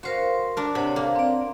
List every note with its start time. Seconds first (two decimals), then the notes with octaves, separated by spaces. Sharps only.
0.03 F#4 A#4 C5 F5 C6
0.57 D4 A#4
0.75 C3 C#5 F#5
0.96 A#3
1.15 C4 D5